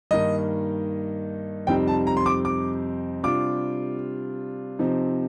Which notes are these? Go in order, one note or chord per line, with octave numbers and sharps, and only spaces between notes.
G2 D#3 A#3 D#4 D#5
F2 C3 G3 C4 D#4 G5
A5
A#5
C6
D6
D6
C3 G3 D4 F4 D6
C3 F3 C4 D#4